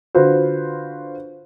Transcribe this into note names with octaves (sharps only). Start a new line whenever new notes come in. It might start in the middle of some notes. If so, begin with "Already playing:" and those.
D3 F4 F#4 B4 C5